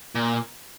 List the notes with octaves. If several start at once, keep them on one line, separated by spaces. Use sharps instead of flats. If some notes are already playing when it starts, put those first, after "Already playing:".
A#2